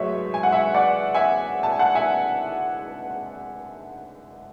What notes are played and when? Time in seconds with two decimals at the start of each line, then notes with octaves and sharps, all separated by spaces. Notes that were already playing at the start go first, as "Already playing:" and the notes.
Already playing: G#2 F#3 A3 B4 C#5 E5
0.34 G#5
0.43 F#5
0.52 E5 G#5
0.74 D5 F#5
1.14 E5 G#5
1.63 A5
1.72 G#5
1.79 F#5 A5
1.95 E5 G#5